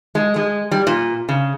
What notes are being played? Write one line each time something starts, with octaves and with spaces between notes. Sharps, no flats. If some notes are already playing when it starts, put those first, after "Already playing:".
G#3
G#3
G3
A#2
C#3